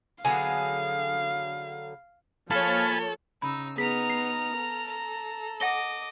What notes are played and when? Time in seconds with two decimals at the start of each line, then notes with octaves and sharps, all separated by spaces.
0.25 D3 F#3 B3 G#4 F5
2.51 F3 A#3 A4 C#5 F5 G#5 A5 B5
3.42 C#3 D#4 B5 E6
3.78 B3 D#4 G#4 A#5 F6 B6
4.10 C7
4.56 A4
4.87 A#5
5.60 D#5 F#5 D6 A#6 G7